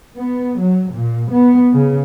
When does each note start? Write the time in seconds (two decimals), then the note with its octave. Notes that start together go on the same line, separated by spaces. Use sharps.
0.17 B3
0.60 F#3
0.93 A#2
1.32 B3
1.73 C#3